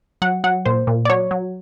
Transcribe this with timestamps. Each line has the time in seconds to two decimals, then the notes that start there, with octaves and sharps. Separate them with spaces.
0.22 F#3 F#5
0.44 F#3 F#5
0.65 A#2 C5
0.87 A#2
1.05 D5
1.09 F#3 C#5
1.31 F#3